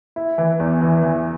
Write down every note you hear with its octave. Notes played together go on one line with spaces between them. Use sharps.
E4
E3
E2
E3
E3